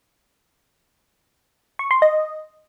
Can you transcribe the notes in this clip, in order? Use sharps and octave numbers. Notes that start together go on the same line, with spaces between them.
C#6
C6
D#5